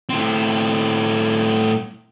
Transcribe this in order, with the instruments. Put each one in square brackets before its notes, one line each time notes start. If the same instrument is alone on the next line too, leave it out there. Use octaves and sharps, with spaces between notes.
[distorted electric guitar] A2 C4